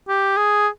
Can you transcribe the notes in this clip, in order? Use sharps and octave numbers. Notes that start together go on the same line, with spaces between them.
G4
G#4